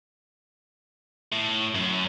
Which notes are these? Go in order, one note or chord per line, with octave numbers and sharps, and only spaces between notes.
A2
F#2